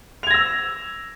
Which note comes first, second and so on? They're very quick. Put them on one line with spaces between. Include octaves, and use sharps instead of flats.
F7 G#6 A#6 E6